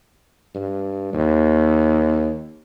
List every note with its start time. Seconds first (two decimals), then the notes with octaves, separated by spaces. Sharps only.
0.55 G2
1.13 D#2